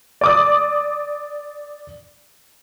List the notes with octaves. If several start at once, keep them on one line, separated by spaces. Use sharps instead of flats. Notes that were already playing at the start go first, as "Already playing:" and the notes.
D5 D6 D#6